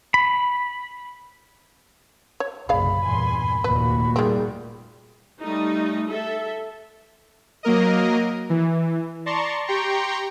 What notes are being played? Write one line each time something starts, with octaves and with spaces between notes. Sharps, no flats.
B5
C#5
F#1 B1 C3 G#4 D5 F5 B5
E2 G2 A#2 G#5 C6
F1 D#2 A#2 F#4 B4
D#3 G3 A3 C4 G#4
G3 A3 D#4
A4 E5
F#3 A#3 A#4 D#5
E3
D5 A5 A#5 C6 C#6
G4 G5 A#5 C6 C#6